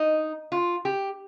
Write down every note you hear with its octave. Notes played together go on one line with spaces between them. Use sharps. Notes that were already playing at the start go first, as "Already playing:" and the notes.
Already playing: D#4
F4
G4